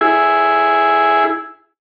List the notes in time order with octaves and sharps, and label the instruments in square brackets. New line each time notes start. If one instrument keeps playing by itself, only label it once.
[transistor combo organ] E4 G#4